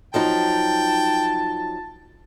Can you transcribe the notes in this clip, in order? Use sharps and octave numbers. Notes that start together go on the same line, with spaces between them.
F3 F#3 D#4 G5 A5